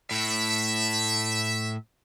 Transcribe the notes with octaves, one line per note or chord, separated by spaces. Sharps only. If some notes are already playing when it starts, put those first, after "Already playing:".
A2 E5